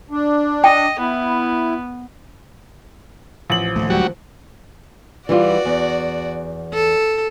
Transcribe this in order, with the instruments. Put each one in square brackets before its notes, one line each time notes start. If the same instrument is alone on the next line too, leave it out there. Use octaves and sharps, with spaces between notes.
[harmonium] D4
[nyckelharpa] D#5 [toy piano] G5
[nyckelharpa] B3 [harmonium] E4
[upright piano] A1 F#7 [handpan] F3
[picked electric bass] D1 D#2 A3
[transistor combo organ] F#3 G3 F#4
[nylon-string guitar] E3 G3 F4 [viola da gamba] F#4 D5
[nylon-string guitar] E2
[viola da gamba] A4